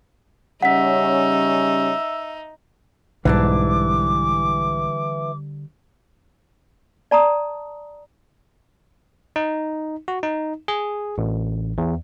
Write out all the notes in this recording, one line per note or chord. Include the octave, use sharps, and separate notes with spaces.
C#3 G3 C#4 D#4 E5 F#5 B6
B1 G#2 D3 E3 G3 D4 D6
D5 A5 A#5 D#6
D#4
F#4
D#4
G#4
A1
E2